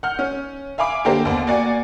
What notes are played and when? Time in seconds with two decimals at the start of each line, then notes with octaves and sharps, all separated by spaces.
0.03 F#5 F6 G6
0.19 C#4
0.78 E5 F5 G#5 B5 D6
1.05 D3 A#3 G4 A#4 C5
1.25 D#2 B3
1.47 A#3 F#4 D5 F#5 G#5